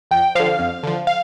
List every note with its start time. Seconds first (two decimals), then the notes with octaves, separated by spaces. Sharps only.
0.11 F2 G5
0.35 D3 F3 F5
0.59 F2
0.83 D3 F3
1.07 F5